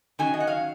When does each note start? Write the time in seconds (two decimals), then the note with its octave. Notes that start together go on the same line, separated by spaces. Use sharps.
0.19 D#3 F#3 C#4 G#5
0.34 D#5
0.40 F#5
0.47 F5